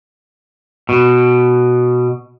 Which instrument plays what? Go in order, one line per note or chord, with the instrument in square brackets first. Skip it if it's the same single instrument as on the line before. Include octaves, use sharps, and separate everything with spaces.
[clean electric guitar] B2